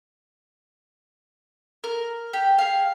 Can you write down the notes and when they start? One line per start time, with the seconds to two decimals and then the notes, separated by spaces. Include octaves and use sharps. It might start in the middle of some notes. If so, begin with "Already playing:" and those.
1.84 A#4
2.33 G4
2.58 G#4 F5